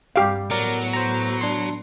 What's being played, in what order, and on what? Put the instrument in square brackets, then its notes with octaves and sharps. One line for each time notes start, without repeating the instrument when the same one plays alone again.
[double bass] G2 G3 [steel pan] G4 F5
[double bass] A2 B3 [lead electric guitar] F#3 [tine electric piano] A#4 D5
[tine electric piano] C5 A#5
D4 C6